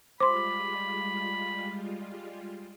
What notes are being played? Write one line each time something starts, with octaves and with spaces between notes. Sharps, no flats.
G3 G#3 F4 C5 B5 C6 D6